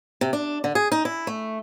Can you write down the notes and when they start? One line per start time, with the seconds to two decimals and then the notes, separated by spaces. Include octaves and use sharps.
0.21 C3
0.33 D4
0.64 D3
0.75 G#4
0.92 D#4
1.05 E4
1.27 A3